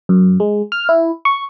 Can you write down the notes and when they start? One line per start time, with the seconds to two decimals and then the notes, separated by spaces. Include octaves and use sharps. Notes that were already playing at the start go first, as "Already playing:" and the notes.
0.09 F#2
0.40 G#3
0.72 F6
0.89 E4
1.25 C#6